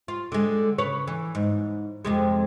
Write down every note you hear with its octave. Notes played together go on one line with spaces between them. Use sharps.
F4
D3 G#3
C#3 B4 C#5
E3
G#2
F2 C3 G#3